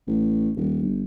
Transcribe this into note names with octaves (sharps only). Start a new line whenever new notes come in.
A1
D#1
G1